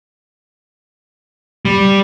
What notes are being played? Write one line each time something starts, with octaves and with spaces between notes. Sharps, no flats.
G3